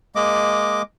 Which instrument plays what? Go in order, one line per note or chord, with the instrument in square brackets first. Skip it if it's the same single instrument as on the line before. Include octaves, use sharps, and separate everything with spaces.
[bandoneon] G#3 A#3 D#5 D6